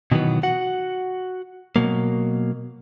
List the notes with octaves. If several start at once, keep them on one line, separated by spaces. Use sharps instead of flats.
B2 D#3 E3 F#3 B3
F#4 F#5
B2 F#3 A#3